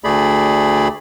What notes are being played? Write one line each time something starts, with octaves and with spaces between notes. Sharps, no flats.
D2 A3 G#4 D5 B5